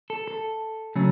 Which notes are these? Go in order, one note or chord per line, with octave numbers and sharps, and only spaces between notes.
A4
A4
C#3 F#3 A3 C#4